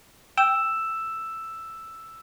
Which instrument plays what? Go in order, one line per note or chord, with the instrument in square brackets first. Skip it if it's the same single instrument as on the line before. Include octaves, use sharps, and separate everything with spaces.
[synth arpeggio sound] G5 [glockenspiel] E6 E7